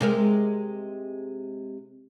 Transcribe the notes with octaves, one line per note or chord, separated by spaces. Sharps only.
C3 G#3 A#4